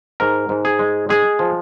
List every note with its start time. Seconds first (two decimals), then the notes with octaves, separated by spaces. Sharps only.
0.20 G#2 A#4
0.49 G#2
0.65 G#4
0.79 G#3
1.09 G#3 G#4
1.39 F3